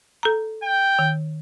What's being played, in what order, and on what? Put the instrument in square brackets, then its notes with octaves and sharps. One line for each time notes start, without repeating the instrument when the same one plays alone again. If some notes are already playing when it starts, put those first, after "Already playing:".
[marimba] A4 A#5
[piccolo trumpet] G5
[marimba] D#3